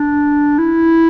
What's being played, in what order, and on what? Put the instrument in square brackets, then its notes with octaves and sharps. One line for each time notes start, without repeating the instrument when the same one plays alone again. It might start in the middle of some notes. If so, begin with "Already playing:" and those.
Already playing: [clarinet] D4
E4